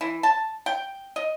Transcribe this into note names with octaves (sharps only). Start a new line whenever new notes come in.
E3
A5
G5
D#5